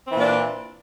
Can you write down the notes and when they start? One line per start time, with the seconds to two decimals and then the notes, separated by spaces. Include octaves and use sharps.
0.07 C4
0.11 E3
0.15 A#2
0.19 D4